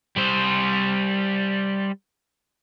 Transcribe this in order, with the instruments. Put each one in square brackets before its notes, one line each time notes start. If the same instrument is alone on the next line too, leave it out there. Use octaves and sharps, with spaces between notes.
[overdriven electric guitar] G3 C5